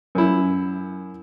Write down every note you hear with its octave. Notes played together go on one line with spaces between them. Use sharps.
F#2 E4